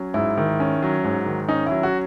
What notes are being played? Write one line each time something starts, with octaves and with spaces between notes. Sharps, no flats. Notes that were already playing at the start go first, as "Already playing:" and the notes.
Already playing: F#3 C#4
G#2 E4
D#3
C#4
F#3
G#2
D#3
C#4 D#4
F#3 E4
F#4